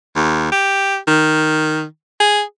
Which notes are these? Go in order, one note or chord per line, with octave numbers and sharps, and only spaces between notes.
D#2
G4
D#3
G#4